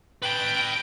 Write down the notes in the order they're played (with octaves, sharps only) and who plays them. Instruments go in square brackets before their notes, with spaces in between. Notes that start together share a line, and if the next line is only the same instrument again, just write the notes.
[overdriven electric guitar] B4 A5 [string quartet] G5